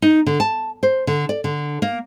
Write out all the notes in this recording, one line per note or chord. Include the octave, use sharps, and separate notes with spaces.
D#4
D3
A5
C5
D3
D5
D3
A#3